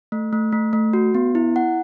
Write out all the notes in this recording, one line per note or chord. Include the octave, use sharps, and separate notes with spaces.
A3
A3
A3
A3
F#4
B3
E4
F#5